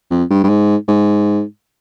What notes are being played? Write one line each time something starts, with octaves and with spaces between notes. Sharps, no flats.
F2
G2
G2
G#2
G#2